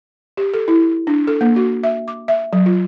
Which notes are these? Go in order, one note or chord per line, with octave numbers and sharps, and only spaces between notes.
G4
A4
E4
D4
A4
A#3
F#4
E5
D6
E5
F#3
F4